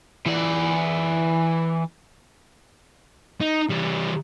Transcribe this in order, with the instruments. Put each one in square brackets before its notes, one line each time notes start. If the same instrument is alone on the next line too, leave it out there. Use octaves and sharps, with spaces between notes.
[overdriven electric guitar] E3 D5
[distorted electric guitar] D#4
E3 G3